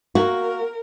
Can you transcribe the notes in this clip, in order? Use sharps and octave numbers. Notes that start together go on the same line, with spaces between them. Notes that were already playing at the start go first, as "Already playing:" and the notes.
A#3 F#4 A#4